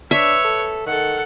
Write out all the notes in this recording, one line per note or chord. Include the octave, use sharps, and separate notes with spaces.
D4 B4 C#5 E5
A4
D#3 A4 F#5